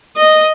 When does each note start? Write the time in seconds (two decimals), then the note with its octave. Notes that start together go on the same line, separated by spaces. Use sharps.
0.17 D#5